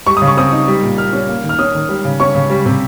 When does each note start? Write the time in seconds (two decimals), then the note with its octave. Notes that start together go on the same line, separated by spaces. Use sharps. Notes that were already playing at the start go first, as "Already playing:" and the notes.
0.07 G3 C#6
0.17 D#6
0.22 C#3
0.27 C#6
0.37 C4 D#6
0.52 D#4
0.68 G3
0.83 A#2
0.98 A#3 F6
1.13 C#4
1.29 A#3
1.44 D#3
1.49 F6
1.59 C#4 D#6
1.75 D#3
1.89 G3
2.05 C#3
2.20 C#4 C#6
2.35 C#3
2.50 G3
2.66 C3